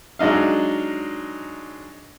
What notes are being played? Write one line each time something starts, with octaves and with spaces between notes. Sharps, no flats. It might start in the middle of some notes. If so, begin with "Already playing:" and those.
F#3 G#3 D4 D#4 F5